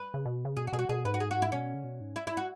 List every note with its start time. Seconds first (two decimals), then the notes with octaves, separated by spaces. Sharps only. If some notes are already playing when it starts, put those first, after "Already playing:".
Already playing: B4
0.14 C#3
0.26 B2
0.45 C#3
0.57 B2 G#4
0.67 F#4
0.73 B2 G#4
0.79 F#4
0.89 B2 G#4
1.05 G#2 B4
1.14 F#4
1.20 G#4
1.31 F#4
1.42 E4
1.52 B2 C#4
1.74 C#3
1.84 B2
2.01 G#2
2.16 E4
2.27 E4
2.37 F#4